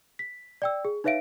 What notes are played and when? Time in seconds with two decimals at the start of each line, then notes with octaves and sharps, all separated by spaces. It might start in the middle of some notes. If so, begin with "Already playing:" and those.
0.19 B6
0.62 D5 G5 E6
0.85 G#4
1.04 D#4 B4 C#5 E5 F5 D7